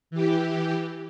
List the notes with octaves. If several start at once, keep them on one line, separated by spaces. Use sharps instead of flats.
E3 G4